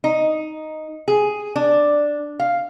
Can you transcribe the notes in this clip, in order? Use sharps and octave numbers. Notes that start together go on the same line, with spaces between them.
D#4
G#4
D4
F5